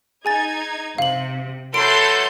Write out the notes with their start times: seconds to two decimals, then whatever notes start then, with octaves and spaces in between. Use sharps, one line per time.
0.25 D#4 G#4 G#5 G#6 A6
0.98 C3 F5 F#7
1.74 E3 F#3 A4 C6 G6 D7